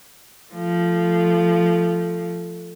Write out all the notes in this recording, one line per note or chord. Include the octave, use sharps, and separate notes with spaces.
F3 A3